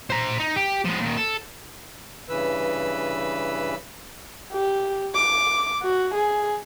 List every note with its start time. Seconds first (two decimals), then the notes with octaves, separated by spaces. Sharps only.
0.10 C5 A#5
0.39 D#4
0.56 G4
0.85 F3 G#3
1.00 A#2 D#3
1.17 A4
2.29 G2 C#3 E3 B4 E6
4.53 G4
5.15 D6
5.83 F#4
6.14 G#4